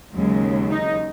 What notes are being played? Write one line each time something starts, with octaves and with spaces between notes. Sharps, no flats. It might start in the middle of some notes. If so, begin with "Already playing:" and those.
D#2 C#3 F#3 G#3
D#4